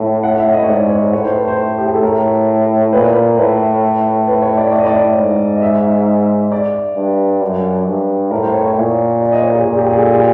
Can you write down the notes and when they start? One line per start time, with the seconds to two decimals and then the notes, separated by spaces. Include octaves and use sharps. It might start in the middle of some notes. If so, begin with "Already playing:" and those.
Already playing: A2
0.23 F#5
0.38 E5
0.53 D#5
0.63 C#5
0.68 G#2 D5
0.90 C#5
1.13 A2 C#5
1.24 C5
1.36 B4
1.48 C5
1.78 G4
1.86 G#4
1.94 A4
2.02 A2 A#4
2.93 A#2 B4
3.02 A#4
3.11 B4
3.37 A2 B4
4.27 B4
4.42 C#5
4.57 D5
4.72 D5
4.79 D#5
4.87 D5
5.16 G#2
5.56 D#5
5.62 E5
6.52 D5
6.96 G2
7.41 F#2
7.86 G2
8.31 A2 A#4
8.42 C5
8.54 C#5
8.65 C#5
8.76 A#2
9.21 D5
9.32 D#5
9.43 C#5
9.55 G#4
9.66 A#2 G#4
9.77 G4
9.89 G#4
9.99 A4
10.08 G#4
10.16 G4